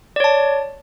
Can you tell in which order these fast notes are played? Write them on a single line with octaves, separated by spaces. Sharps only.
D5 C#5 A5